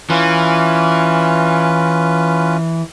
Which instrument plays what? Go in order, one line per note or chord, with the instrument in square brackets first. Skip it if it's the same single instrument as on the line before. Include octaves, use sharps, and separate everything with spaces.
[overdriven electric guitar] E3 [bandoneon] C#4 F4 B4